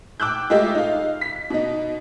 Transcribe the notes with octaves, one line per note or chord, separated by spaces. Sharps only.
G5 D6 E6 F#6 G6
G#3 A3 F4 G4 D#5 E5
D#4 F5
B6
B2 D#4